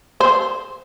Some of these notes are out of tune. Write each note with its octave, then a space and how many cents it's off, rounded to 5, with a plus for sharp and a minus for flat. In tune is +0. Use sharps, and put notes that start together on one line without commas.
C5 -15